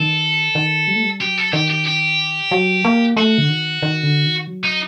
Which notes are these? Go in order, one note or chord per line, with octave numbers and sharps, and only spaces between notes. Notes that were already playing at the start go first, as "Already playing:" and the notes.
Already playing: D#3 A4
D#3
G3
A3
G3
F#3 G4
A4
D#3 G4
G4
G4
F#3
A#3
A3 F#4
D3
D#3
D#3
D3
D#3
F#3
D#4